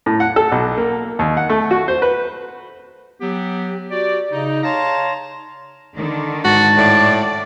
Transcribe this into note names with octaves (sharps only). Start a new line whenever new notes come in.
A2
F#5
A4
B1
A#3
D#2
F#5
A3
F#4
C5
B4
F#3 B3 G4
F#4 G4 D5
C#3 D#4
C#5 F5 A5 A#5 C6
D3 D#3
G#2 F#4 A5
A2 D5